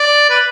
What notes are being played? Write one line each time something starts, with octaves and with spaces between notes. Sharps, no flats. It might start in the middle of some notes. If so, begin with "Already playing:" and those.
Already playing: D5
B4